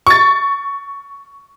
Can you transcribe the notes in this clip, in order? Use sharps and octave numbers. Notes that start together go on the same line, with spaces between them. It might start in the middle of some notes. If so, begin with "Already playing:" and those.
C#6 A6